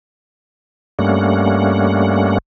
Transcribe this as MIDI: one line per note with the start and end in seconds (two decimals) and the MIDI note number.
0.99 2.38 43
0.99 2.38 55
0.99 2.38 57
0.99 2.38 58
0.99 2.38 61
0.99 2.38 78